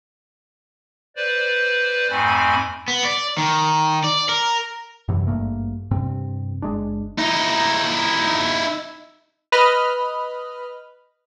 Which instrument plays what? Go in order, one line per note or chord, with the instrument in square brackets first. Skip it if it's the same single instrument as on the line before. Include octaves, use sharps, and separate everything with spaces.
[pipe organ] B4 C5 D5
F2 G#2 A3 C4 G#5 B5
[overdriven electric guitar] B3
D5
D#3
D5
A#4
[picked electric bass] F#2 C3 E3 F#3
G#1 G2 A3 A#3
G2 C3 C4
F#1 G#3 D4
[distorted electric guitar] D#4 E4
[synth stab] B4 D#5 B5 F6